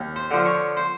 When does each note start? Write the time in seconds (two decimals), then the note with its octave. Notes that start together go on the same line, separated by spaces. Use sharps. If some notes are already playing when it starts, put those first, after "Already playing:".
Already playing: D#2
0.16 C5 C6
0.31 D3 F3
0.46 C#5 C#6
0.77 C5 C6